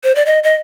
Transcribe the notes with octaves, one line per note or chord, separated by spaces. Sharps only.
C5
D5
D#5
D#5